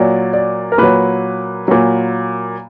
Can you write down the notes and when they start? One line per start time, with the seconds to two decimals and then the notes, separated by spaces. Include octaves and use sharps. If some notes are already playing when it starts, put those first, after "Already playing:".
Already playing: A#2 F#3 D5
0.33 D5
0.72 A#4
0.78 A#2 F#3 B4
1.68 A#2 F#3